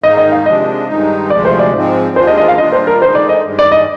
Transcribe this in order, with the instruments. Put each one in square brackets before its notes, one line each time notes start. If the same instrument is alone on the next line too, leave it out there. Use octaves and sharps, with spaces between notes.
[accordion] G#2 D#3 A#3 D#4 [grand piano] D#5
[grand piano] D#5
F5
[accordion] C3 F3 G#3 D4 [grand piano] D#5
[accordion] G2 D#3 G#3 D#4
[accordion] D2 C3 F3 G#3 [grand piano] D5
[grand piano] C5
D5
[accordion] G#2 F3 G#3 C4
[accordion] D#2 D#3 G#3 D4 F4 [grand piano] C5
[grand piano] D#5
D#5
F5
[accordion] A#2 G3 D4 F4 [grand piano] D#5
[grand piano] C5
A#4
[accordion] D3 G#3 D#4 [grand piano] C5
[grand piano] D5
D#5
[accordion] G2 D#3 G#3
[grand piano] D5
D#5